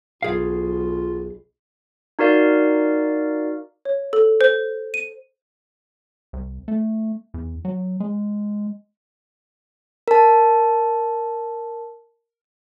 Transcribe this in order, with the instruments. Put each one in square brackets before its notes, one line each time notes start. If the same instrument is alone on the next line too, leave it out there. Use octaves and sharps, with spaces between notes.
[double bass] B1 [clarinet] F4 [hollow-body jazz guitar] G#4 F5
[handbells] D#4 F#4 A#4 D5 F5
[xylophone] C#5
A4
C5
D#7
[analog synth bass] C2
A3
E2
F#3
G#3
[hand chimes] A#4 A5